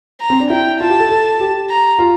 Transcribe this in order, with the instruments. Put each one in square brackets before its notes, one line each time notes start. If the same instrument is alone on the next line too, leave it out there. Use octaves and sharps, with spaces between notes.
[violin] A#5
[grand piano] C4
D4
[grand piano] E4 [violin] G5
[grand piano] F4 [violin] A5
[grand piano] G4
A4
A4
G4
[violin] A#5
[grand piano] F4